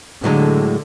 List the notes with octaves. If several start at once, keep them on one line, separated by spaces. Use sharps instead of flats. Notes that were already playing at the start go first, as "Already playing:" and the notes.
A2 D3 F#3 G#3